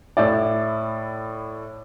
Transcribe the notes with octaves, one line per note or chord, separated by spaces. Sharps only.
A2 E4 D5